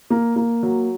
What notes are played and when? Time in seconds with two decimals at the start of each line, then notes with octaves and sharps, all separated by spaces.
0.10 A#3
0.36 A#3
0.63 F#3